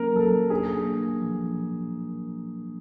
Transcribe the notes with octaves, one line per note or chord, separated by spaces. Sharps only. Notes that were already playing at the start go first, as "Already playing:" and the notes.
Already playing: F#3 A#3 C#4 A#4
F#3 A4
D4 G#4
A#3
F3